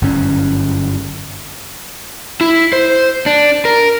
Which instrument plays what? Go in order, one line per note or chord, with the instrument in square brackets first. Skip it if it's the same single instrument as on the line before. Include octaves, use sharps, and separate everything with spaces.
[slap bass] G1 F#2 C#4
[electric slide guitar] E4
C5
D4
A#4